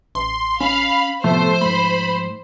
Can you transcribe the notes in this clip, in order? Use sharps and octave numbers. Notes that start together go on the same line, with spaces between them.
A1 C6
C#4 F5 B5
A2 C3 F3 A3 B3 C5
G#2 A3 B5